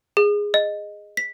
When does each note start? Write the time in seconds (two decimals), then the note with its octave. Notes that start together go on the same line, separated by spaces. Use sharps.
0.17 G#4
0.54 D#5
1.17 B6